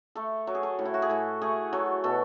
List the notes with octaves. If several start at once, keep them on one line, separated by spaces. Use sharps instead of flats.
A3 A4
F#3
G#4
A4
A2
E4
F#4
G#4
A2 A4
A3 G#4
F#3 A4
B2 A4